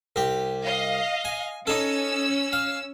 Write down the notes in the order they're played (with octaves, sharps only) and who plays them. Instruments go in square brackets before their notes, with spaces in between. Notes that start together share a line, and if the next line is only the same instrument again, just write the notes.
[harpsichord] C2 G4
[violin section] D#5 F5
[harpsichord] G#5
[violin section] C#4 E6 [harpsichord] D#4 A4
[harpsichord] F5